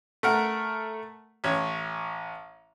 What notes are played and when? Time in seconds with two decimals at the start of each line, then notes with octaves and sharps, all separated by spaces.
0.23 A3 A#4 F#5
1.44 A1 C#5